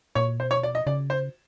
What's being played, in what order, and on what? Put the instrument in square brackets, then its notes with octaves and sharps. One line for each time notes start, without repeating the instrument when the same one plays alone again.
[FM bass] A#2 [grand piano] C#5
[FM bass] B2 [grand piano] C5
[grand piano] C#5
D5
D#5
[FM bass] C#3 [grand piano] D5
[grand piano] C5